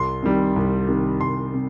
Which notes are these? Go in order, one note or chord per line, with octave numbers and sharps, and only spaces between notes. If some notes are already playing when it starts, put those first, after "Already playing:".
Already playing: C2 C6
C3 D#3 G3
C2
C3 D#3 G3
C2 C6
C3